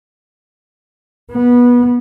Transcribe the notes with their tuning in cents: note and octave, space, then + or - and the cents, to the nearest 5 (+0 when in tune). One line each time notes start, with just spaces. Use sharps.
B3 -20